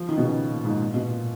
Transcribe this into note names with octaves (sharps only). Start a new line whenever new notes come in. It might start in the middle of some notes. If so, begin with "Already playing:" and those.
Already playing: F3
D#3
B2
C#3
A#2
G#2
A#2
B2
A#2